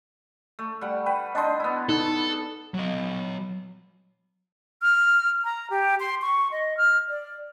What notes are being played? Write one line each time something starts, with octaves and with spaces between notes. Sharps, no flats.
A3
G3 F#5
B4 G5
D4 D#4 D#5 A5 C6
B3 E4
D#4 A4
F#3 D#5
F6
A#5
G4
C6
C#6
D#5
F6
D5